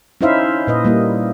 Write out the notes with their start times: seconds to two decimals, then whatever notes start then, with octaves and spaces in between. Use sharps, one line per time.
0.21 C#4 D#4 E4 C5 E5 F5
0.67 A#2 B4 D#5
0.85 G3 A#3 E4